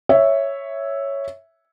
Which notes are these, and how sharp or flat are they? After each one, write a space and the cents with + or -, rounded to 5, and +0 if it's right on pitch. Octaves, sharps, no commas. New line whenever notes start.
C#5 +0 E5 +0